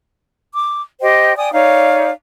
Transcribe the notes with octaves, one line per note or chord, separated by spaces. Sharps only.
D6
G4 C5 D#5 G5
D5 G5 G#5 D#6
D#4 C#5 D5 F5